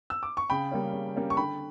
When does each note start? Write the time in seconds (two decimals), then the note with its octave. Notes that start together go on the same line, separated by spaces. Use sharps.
0.10 E6
0.23 D6
0.37 C#6
0.50 C#3 G5 B5
0.71 G3 A#3 C#4
0.93 C#3
1.16 G3 A#3 C#4
1.30 C#6
1.37 D3 G5 B5